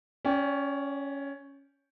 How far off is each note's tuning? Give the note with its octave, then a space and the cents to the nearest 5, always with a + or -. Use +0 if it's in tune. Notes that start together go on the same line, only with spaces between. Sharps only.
C#4 +5 D5 -35 G5 +0